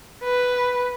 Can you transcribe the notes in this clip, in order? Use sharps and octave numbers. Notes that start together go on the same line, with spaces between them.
B4